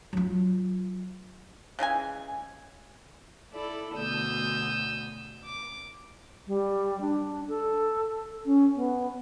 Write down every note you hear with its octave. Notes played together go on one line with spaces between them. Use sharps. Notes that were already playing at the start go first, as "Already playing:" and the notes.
F#3 F4
C#3 E3 G#3 G#5
E4 A4 D5
D2 B2 D#6 E6 G6
D6
G3
D4
A4
C#4
B3